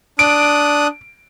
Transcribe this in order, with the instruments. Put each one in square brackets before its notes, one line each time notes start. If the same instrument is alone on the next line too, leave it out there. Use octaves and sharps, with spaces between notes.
[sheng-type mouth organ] D4 D#6 F#6 [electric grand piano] D7